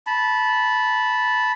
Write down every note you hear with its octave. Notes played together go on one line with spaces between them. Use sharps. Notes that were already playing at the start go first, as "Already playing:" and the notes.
A5 B5